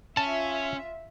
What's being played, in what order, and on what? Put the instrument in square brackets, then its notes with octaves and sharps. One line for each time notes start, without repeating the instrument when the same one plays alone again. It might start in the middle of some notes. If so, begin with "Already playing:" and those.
[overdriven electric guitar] C#4 [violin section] F4 E5 [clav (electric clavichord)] A5